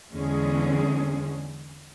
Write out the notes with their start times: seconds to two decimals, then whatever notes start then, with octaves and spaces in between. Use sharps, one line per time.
0.13 E2 D3 E3 G#3 C#4 G#4